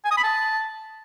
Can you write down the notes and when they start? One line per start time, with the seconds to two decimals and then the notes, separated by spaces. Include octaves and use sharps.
0.05 G#5
0.11 D#6
0.17 B5
0.23 A5